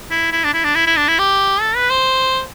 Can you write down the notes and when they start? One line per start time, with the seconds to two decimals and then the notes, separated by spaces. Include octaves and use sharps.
0.11 E4
0.32 E4
0.44 D4
0.54 E4
0.64 D4
0.75 E4
0.86 E4
0.96 D4
1.08 E4
1.19 G4
1.61 A4
1.76 B4
1.90 C5